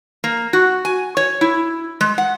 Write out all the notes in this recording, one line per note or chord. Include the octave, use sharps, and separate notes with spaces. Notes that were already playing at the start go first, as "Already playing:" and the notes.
A#3
F#4
G#5
C#5
E4
G#3
F#5